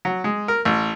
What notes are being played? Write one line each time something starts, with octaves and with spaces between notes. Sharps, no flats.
F#3
G#3
A#4
A1